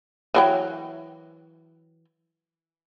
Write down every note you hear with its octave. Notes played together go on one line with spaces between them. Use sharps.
E3 F#3 G5